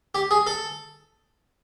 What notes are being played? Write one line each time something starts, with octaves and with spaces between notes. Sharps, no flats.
G4
G#4
A4